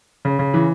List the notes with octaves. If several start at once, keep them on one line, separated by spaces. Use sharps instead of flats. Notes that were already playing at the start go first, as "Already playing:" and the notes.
C#3
C#3
E3